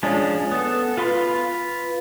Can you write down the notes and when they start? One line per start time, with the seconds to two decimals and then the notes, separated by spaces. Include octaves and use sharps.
0.03 F3 G#3 C#4 D4
0.52 B3 A4
0.97 F4 B4 C6